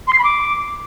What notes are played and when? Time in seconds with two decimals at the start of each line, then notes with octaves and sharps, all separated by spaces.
0.07 C6
0.13 C7
0.18 B5
0.24 D6